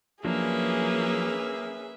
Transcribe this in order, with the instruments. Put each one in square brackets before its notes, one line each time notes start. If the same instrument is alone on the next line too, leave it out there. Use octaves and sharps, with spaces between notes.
[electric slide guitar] F3 F#3 D4 [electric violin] A#3 [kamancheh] C#4 G#4 [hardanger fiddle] B4 E5